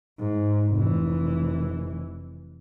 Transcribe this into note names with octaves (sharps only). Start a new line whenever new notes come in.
G#2
F1 E3